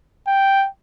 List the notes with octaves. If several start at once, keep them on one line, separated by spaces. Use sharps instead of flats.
G5